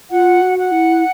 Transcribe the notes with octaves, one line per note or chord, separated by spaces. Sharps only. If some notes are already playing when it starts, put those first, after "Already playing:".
F4 F#5
F#4
F#5
E4